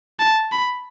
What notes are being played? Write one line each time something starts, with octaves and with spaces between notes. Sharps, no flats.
A5
B5